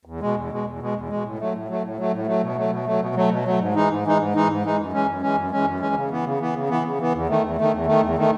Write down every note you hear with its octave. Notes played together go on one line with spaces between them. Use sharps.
E2
B2 G#3
E2
B2 G#3
E2
B2 G#3
E2
B2 G#3
A2
F#3 A3
A2
F#3 A3
A2
F#3 A3
A2
F#3 A3
B2
F#3 A3
B2
F#3 A3
B2
F#3 A3
B2
F#3 A3
G#2
E3 G#3 D#4
G#2
E3 G#3 D#4
G#2
E3 G#3 D#4
G#2
E3 G#3 D#4
F#2
E3 G#3 C#4
F#2
E3 G#3 C#4
F#2
E3 G#3 C#4
F#2
E3 G#3 C#4
C#3
E3 B3
C#3
E3 B3
C#3
E3 B3
C#3
E3 B3
E2
D#3 A3
E2
D#3 A3
E2
D#3 A3
E2
D#3 A3